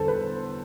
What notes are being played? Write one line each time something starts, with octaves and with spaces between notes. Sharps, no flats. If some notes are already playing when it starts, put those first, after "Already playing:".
Already playing: E2 D3 G3 A4 C5
B4